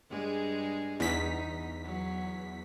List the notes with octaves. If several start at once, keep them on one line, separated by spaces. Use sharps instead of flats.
G2 G#3 G#4
E2 D#4 B6
F#3